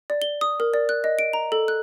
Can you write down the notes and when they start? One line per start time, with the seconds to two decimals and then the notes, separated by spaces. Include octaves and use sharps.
0.10 D5
0.22 G7
0.41 D#6
0.60 A#4
0.74 D5
0.89 F#6
1.04 D#5
1.19 D7
1.33 A#5
1.52 A4
1.68 F#6